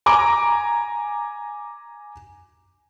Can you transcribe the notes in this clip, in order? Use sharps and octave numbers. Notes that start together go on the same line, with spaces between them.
G#5 A#5 D6